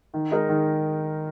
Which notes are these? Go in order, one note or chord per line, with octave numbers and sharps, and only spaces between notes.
D#3
G#3 D#4 A#4
D#3